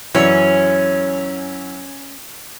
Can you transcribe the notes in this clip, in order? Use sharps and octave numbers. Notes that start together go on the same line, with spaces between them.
F#2 E3 C#4